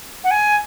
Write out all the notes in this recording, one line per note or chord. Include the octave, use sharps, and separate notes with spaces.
F#5
G#5